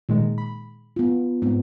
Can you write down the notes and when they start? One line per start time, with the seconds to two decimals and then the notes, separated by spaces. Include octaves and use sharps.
0.09 A#2 D#3 G#3
0.38 B5
0.96 B3 F4
1.42 G#2 G#3 B3 C4